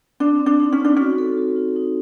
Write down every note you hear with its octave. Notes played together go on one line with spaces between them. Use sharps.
C4 D4
C4
D4
D#4
C#4
D#4
D4
C#4 F#4
A4
F#4
D#4
D#4